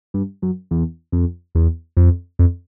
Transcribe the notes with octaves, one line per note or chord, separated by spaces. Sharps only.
G2
F#2
E2
F2
E2
F2
F2